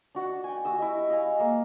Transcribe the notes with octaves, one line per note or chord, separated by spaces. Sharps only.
D4 F#4 F#5
G5 G#5
F#4 G4 D#6 E6
E4 D#5
D#5 F5 G#5
G#3 A#3